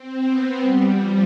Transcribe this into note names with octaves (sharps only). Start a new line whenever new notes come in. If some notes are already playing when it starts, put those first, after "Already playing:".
Already playing: C4
B3
G3
F3